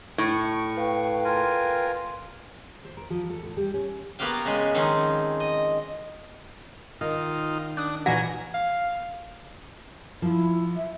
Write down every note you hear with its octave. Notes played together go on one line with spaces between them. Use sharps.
A2 C#6
B4 F5 G5
F4 A#4 G#5
C5
A#4
F3
A4
A2
G3
C#4
A#3 B3 F#4 G4 F5 G5
C#3 G#3
D#3 F3 C4 C#4 D#4
D#5
D#3 D#4 F4
D4 D#6 F#6
A#2 E3 F#4 F#5 G#5 A#5
F5
F3 E4
E5